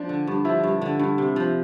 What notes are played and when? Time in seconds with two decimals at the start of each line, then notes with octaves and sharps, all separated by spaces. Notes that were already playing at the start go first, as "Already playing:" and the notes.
Already playing: F3 D4
0.09 D3
0.27 G2
0.45 F3 E4
0.64 G2
0.82 D3
1.00 G2
1.18 C3
1.36 F3